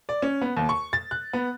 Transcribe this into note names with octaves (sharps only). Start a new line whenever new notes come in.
D5
C#4
B3
D#2
C#6
A6
F#6
B3